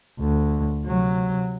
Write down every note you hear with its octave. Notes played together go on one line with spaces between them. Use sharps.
D2
C3 F#3